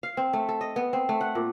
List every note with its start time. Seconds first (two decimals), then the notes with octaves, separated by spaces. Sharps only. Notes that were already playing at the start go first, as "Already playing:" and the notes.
0.03 F5
0.17 C4
0.33 A3
0.49 A4
0.61 D#5
0.76 B3
0.93 C4
1.09 A3
1.21 F#5
1.35 A#2